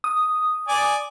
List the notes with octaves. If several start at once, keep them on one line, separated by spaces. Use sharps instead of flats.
D#6
D5 G#5